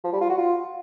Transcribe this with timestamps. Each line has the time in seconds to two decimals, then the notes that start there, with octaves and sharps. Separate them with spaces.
0.04 F3
0.13 G3
0.21 F4
0.30 F#4
0.38 F4